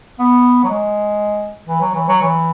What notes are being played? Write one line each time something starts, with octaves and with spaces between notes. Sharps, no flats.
B3
F#3
G#3
E3
F#3
E3
F#3
E3